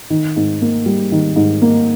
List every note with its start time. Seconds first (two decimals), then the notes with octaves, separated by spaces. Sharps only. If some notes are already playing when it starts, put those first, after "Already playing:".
0.10 D#3
0.36 G#2
0.62 A#3
0.86 G3
1.12 D#3
1.36 G#2
1.62 A#3